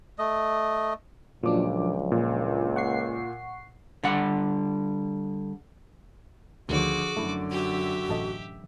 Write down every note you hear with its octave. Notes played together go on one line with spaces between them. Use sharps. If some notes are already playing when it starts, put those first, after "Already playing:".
A3 D#5
C#2 A#2 F3 F#3 D4 D6
A#2
F#5 C#6 C7
D3 G3 F#5
D2 D3 D#3 F3 F#4 G#4 C#5 D6
F#2 D3 A3 E4
F#4 G4 E5
A1 A4 D#5